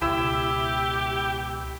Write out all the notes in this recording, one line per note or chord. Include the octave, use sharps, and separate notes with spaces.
C#2 B2 E4 G4 E6